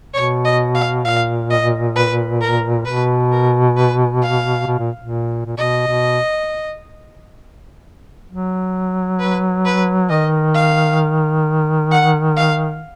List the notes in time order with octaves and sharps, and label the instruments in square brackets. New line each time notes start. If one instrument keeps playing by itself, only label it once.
[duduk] B2 [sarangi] C#5
[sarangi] D#5
F5
[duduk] A#2 [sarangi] F5
[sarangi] D#5
B4
A#4
[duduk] B2 [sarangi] B4
[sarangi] A#4
B4
F5
[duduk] B2
A#2
A#2
A#2
[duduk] B2 [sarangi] D#5
[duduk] B2
F#3
[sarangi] B4
B4
[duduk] D#3 [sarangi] D#5
[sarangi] F5
F#5
F5